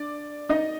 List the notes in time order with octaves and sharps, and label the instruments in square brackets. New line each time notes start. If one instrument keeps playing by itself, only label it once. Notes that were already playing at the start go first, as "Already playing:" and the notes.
Already playing: [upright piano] D4 D5
D#4 D#5